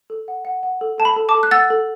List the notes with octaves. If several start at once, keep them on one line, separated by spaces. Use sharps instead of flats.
A4
F#5
F#5
F#5
A4
A4 A5
B5
A4
A5 D6
A4
F#6
F#5 E6 A6
A4